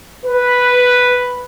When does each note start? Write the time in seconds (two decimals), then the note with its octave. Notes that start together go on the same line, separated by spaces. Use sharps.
0.25 B4